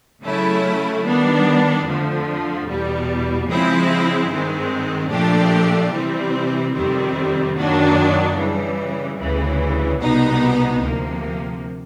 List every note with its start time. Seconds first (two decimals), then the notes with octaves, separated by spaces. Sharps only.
0.24 C#3 F#3 A3 C#4 E4
1.04 D#3 G3 B3 D4
1.86 F2 D3 F3 A3
2.68 E2 B2 G3
3.49 C#3 F3 G#3 C4 E4
4.30 G2 D#3 G#3 C4
5.11 A#2 F3 A3 D4 G4
5.93 C3 E3 G3 C4
6.74 F2 C3 D#3 G3 C4
7.55 F#2 D#3 F#3 A#3 D4
8.36 C#3 E3 G3
9.17 D2 C#3 E3 G3
10.00 C2 B2 G3 B3 D#4
10.80 D2 C3 F3 A#3